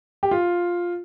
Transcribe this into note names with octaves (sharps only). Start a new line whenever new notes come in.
G4
F4